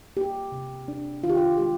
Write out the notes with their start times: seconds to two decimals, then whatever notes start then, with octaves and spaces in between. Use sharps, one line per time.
0.17 A#3 G4
0.52 C3
0.88 D4
1.23 D#3 F4
1.30 G4
1.37 F4
1.58 G#3 G4